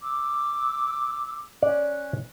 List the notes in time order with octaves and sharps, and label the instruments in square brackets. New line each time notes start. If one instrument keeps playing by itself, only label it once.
[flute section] D6 E6
[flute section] C#4 F#6 [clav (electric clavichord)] D5